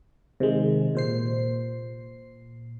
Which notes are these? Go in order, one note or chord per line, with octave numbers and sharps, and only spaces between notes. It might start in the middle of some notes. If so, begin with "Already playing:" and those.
C3 D#3 G#3
A#2 C5 C7